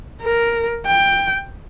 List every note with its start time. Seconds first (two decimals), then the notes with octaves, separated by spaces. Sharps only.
0.22 A#4
0.86 G5